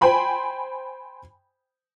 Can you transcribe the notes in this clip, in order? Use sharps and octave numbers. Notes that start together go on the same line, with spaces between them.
C5 G5 G#5 B5 C6